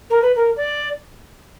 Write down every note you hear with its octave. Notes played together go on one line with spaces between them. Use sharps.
A#4
B4
A#4
D5